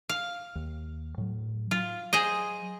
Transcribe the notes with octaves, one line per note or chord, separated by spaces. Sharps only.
F5
D#2
A2 F#3
F#3 F4
G#4 C5 D#5